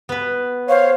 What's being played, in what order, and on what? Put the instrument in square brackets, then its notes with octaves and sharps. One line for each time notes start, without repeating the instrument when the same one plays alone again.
[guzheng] B3 B4
[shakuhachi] C5 [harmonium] C#5 [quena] F5